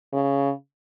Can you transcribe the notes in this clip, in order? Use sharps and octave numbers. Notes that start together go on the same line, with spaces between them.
C#3